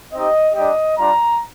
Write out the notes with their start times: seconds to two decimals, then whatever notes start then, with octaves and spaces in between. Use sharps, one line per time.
0.13 C4 D#4 G4 D#5
0.55 G3 D4 G4 D#5
0.97 G3 D4 F4 A#5